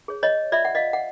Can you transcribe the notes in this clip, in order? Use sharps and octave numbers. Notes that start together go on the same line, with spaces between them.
G#4 C#5
C#5 D#5
F4 D5 E5
F#5
D#5 F5
F#5